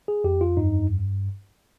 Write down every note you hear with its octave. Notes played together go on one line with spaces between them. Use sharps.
G#4
F2 G4
F4
G2 D#4